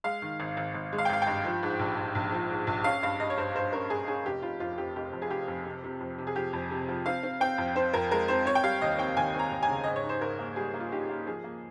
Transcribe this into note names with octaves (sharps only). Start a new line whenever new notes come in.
G#3 F5
D#3
G#1
G#1
G#1
G#3
F5
G5
G#1 F5
G5
G2
F3
G#2
A#1
G#2
A#1
F3
G#2
A#1
C#4 F5
G2 F5
G2 D#5
C#5
G2 C5
G2 C5
C#4 A#4
G2 G#4
C#4 G#4
F1 G4
F1 F4
F2 F4
F2 G4
F1 G4
F2
G#4
F1 G4
F2
C3
C3
F2
C3
G#4
F3 G4
F2
C3
F3
C4 F5
C4
C4 G5
F2
C4 C5
F2 A#4
G#3 A#4
C4 C5
C4 C#5
G5
G3 F5
D#2 D#5
C4 G5
D#2 G#5
C4
A#5
D#2
G#5
C#3
G#2 D#5
C#5
D#4
C5
G#2 A#4
A#3
G3 G#4
A#3
F4
D#4 G4
A#3
F3 G#4
A#3